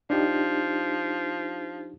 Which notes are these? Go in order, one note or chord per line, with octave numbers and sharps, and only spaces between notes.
F3 D4 D#4 G4